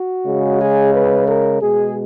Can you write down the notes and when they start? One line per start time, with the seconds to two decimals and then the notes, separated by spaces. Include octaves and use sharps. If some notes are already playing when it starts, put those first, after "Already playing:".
Already playing: F#4
0.25 C#3 G#3
0.59 G#4
0.92 B4
1.26 A#4
1.60 B2 G#3 G#4